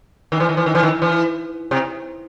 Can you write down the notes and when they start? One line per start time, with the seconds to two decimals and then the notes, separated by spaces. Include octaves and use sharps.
0.32 D#3
0.40 E3
0.49 D#3
0.57 E3
0.66 D#3
0.75 E3
0.83 D#3
1.02 E3
1.71 C3